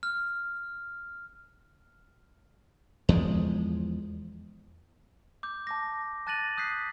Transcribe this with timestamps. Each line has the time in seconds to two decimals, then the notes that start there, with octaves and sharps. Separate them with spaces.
0.03 F6
3.09 E2 F3 G#3
5.43 D6 G6
5.67 A5 D6 A#6
6.27 A5 F#6 A6 A#6 D#7 F#7
6.57 D#6 F#6 G6 B6 C7